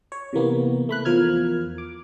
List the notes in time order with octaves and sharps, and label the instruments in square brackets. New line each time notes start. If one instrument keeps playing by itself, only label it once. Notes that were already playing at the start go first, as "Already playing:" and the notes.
[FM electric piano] C#5
C3 E3 A#3 B3
A3 B5 F#6
E2 F3 A#4 F6 G#6
D6